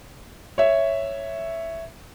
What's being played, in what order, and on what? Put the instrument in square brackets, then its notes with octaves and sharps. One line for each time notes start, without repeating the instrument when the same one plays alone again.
[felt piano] C#5 E5